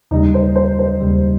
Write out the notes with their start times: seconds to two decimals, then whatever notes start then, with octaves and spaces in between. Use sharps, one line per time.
0.11 D#2 C#3 G3 D#4
0.34 C5
0.55 C5
0.79 C5
1.01 D#2 C#3 G3